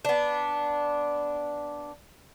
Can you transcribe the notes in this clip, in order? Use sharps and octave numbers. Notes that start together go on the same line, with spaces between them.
B3 D4